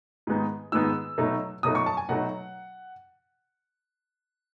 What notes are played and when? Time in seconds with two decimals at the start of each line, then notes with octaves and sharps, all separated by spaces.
0.27 G#2 D#3 G#3 B3 D#4
0.72 G#2 D#3 G#3 B3 D#4 E6
1.18 B2 F#3 A3 D#4
1.63 B2 F#3 A3 D#4 D#6
1.75 C#6
1.86 A5
1.97 G#5
2.09 B2 F#3 A3 D#4 F#5